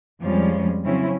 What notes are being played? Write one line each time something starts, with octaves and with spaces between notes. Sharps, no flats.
F2 F3 G3 G#3 C#4
C#3 F#3 C4 C#4 E4